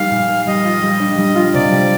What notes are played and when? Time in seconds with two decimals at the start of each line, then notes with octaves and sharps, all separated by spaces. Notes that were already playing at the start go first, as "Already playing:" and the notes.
Already playing: G3 A#3 D#4 F5
0.11 A#2
0.29 A#3
0.47 G3 D#5
0.65 F4
0.82 G3
1.00 D4
1.18 G3
1.35 F4
1.54 C3 D5
1.71 G3